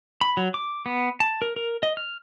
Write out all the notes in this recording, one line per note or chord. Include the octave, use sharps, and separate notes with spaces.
B5
F#3
D6
B3
A5
A#4
A#4
D#5
F6